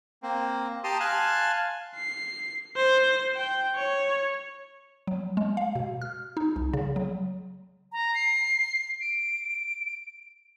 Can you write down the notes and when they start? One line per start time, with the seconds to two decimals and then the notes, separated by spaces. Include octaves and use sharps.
0.23 A#3 C4
0.84 G4 A5 A#5 C6 D#6
1.00 F5 G#5 A5 C6 F#6
1.96 C7
2.76 C5
3.35 G5
3.75 C#5
5.07 F#3
5.37 G#3
5.57 F5
5.75 B2
6.02 F6
6.37 D#4
6.56 C2
6.73 C#3
6.96 F#3
7.92 A#5
8.14 C7
9.01 D7